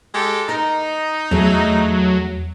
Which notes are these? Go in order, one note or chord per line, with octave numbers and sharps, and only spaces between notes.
G#3 G4 A4
D#4 A#4
E2 F#3 A3 G#4